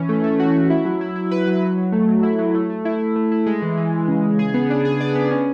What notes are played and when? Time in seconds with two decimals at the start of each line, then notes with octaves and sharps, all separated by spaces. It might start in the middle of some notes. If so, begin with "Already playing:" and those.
Already playing: E3 C#4
0.09 A3
0.24 A3
0.40 F#4
0.54 A3
0.70 E4
0.85 F#3
1.01 E4
1.16 E4
1.31 B4
1.47 F#3
1.62 F#3
1.78 F#3
1.92 A3
2.09 F#3
2.23 E4
2.39 F#3
2.55 A3
2.70 A3
2.85 E4
3.00 E4
3.16 A3
3.32 E4
3.46 G#3
3.62 E3
3.77 E3
3.93 E3
4.08 C#3
4.23 C#3
4.39 G#4
4.54 B3
4.70 D4
4.85 G#4
5.00 D5
5.15 B3
5.31 C#4